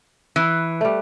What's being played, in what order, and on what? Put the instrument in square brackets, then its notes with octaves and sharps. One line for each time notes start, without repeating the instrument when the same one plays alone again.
[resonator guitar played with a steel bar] E3
[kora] G3 A3